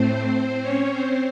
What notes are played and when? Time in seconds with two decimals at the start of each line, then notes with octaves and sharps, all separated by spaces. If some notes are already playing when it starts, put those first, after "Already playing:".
Already playing: A2 A3 C4 C5
0.62 C#4 C#5
0.91 C4 C5